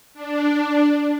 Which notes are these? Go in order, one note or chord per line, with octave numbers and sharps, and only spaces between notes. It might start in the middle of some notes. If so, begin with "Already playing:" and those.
D4